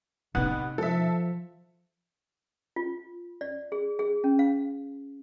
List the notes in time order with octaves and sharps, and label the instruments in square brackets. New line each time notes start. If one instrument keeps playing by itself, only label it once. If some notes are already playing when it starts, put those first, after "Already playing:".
[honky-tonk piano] A1 B3 F#6 [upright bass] C3 D#4
[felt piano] F3 [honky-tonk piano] A4 E5
[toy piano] F4
D5
G#4
G#4
C#4
F5